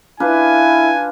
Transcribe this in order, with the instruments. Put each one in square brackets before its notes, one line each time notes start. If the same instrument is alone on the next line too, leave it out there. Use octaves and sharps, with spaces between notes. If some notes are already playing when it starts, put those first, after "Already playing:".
[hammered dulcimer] D4 F4 B4 [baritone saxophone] E4 [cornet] G#5